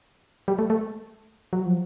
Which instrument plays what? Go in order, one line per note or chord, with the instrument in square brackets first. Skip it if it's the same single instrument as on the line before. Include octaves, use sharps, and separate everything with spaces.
[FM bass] G3
A3
A3
F#3
F3